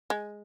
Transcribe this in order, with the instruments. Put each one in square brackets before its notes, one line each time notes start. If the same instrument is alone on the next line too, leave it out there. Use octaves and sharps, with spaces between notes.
[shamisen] G#3